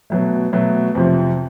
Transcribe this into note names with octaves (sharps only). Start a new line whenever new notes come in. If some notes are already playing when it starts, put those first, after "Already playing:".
B2 F#3 A3
B2 F#3 A3
F2 C3 F3